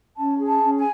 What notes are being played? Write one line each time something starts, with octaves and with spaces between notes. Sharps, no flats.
C#4 A5
G#4
A5
C#4
G#5